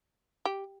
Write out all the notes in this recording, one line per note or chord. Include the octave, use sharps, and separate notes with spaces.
G4